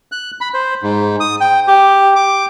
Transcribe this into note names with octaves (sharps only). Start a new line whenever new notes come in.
F#6
B5
C5
G#2
D#6
G5
G4
D6